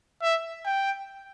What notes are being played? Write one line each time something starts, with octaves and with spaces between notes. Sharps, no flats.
E5
G5